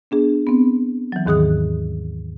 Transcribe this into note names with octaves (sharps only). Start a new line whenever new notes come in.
B3 D4 G#4
B3 C4
E3 F#3
D#2 G#2 D#3 G#4 D#6 F#6